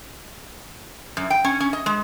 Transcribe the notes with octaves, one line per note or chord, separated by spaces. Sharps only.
F#2
G5
C#4
C#4
D#5
G#3